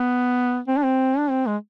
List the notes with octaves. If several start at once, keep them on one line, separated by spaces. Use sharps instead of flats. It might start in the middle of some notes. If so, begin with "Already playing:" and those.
Already playing: B3
C4
D4
C4
D4
C4
G#3